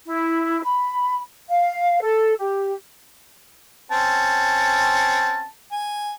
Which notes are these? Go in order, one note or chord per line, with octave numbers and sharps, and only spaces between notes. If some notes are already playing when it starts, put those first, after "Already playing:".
E4
B5
F5
A4
G4
C4 C#4 A5
G#5